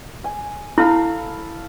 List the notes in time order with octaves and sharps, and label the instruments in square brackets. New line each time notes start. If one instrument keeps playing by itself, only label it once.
[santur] G#5
[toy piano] E4 [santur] A4 F5 B5